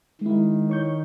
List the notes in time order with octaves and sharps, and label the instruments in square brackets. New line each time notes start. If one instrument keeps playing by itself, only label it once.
[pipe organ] D#3 [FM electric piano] G#3 E4
[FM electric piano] C#5 C#6 G6